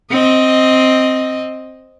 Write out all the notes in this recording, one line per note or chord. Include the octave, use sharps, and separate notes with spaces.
C4 D#5